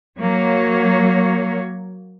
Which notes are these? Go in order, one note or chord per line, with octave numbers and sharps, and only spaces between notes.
F#3 A#3 C#5